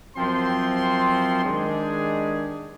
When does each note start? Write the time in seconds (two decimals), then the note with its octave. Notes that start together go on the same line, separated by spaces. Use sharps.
0.16 F#2 F3 C4 C6
1.44 D#3 G#3 D4 G4 G#4